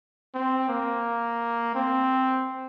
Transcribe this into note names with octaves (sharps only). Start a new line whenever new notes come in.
C4
A#3
C4